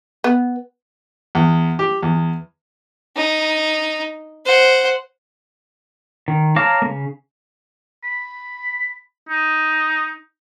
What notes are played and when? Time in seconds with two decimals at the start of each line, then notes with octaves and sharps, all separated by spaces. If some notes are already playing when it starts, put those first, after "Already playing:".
0.24 B3
1.35 E2
1.79 G4
2.03 E2
3.17 D#4
4.46 C5 F#5
6.28 D#3
6.56 C#5 F5 A5 A#5 D6
6.82 C#3 A#3
8.04 B5
9.29 D#4